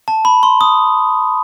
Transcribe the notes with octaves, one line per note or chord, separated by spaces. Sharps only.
A5
B5
C6
D#6